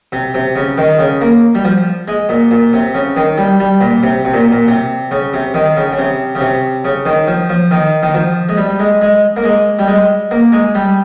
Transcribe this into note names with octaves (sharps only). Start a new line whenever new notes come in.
C3
C3
C#3
D#3
C#3
A#3
G3
F3
G#3
A#2
A#2
C3
C#3
D#3
G3
G3
A#2
C3
C3
A#2
A#2
C3
C#3
C3
D#3
C#3
C#3
C3
C#3
C3
C#3
D#3
F3
F3
D#3
D#3
F3
G#3
G3
G#3
G#3
A#3
G#3
G3
G#3
A#3
G#3
G3